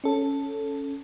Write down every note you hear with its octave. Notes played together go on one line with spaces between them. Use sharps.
C#4 A4